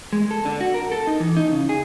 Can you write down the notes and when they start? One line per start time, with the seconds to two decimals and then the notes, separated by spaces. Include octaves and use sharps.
0.13 G#3
0.31 A4
0.45 D3
0.61 F#4
0.74 A#4
0.92 A4
1.07 D#4
1.20 E3
1.37 D#4
1.52 C#3
1.69 G#4